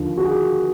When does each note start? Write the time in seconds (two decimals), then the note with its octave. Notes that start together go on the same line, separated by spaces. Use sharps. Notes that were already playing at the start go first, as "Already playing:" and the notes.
Already playing: D#2 D3 F3
0.17 F#4
0.24 G#4